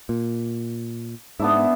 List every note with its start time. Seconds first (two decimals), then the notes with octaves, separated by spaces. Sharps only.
0.09 A#2
1.40 G#2 B3 D4 E4